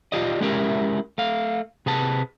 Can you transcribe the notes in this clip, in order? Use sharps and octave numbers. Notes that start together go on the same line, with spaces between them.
F4 G4 D5 D#5
G#3 C#4 E4 G4 A#4 E5
A3 F5
C3 G#4 B4 A5